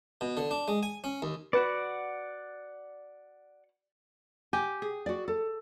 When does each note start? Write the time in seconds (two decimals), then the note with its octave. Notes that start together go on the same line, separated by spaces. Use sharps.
0.21 B2
0.37 D3
0.51 D4
0.68 G#3
0.83 G#5
1.04 C#4
1.22 D#2
1.53 F#4 B4 D5 F#5
4.53 G4 G#5
4.82 G#4
5.06 F#4 D5
5.28 A4